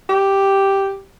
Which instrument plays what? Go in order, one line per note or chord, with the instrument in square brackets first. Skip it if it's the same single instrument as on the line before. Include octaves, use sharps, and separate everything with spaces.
[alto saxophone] G4